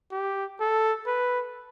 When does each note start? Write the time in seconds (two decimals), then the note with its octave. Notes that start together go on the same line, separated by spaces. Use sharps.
0.12 G4
0.60 A4
1.07 B4